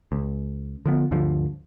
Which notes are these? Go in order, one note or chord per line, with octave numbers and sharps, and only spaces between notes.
C#2
D3 F3 B3
D2 G2 D3 F3